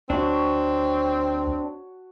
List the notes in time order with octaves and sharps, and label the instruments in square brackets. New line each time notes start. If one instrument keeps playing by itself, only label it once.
[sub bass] D2 [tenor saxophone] C4 [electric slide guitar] D4 [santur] F#4 C#5 A5